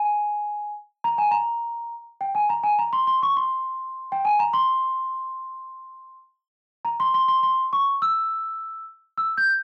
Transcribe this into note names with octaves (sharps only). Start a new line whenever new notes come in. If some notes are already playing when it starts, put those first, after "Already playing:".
Already playing: G#5
A#5
G#5
A#5
G5
G#5
A#5
G#5
A#5
C6
C6
C#6
C6
G5
G#5
A#5
C6
A#5
C6
C6
C6
C6
C#6
E6
E6
G6